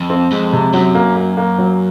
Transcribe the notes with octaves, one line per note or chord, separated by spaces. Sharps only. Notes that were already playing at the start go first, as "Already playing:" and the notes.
Already playing: F2
C4
F2 G#3
C3
F#2 F#3
A#3
A#3
A#3
F#3